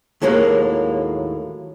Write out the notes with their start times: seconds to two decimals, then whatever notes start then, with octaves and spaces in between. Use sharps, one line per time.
0.22 D#2 A2 F#3 G#3 A#3